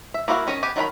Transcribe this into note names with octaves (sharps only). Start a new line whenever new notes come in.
E5
A#3 E4 F#4 C#5 F5
D#3 C#4 C#5 D#5
B3 G4 G#5
D#3 F#3 F4 A#4 B5